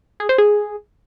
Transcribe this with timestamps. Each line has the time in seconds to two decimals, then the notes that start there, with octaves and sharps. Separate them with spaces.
0.20 G#4
0.29 C5
0.38 G#4